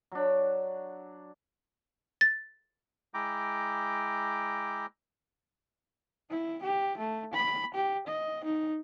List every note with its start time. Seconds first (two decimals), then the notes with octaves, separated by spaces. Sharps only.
0.12 F#3 D4
2.21 A6
3.14 G#3 E4 G5 A#5 D6
6.31 E4
6.63 G4
6.98 A3
7.34 B5
7.74 G4
8.07 D#5
8.44 D#4